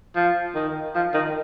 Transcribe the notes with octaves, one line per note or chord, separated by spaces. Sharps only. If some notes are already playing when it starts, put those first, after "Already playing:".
F3
D#3
F3
D#3